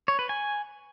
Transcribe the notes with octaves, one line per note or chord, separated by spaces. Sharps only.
C#5
B4
G#5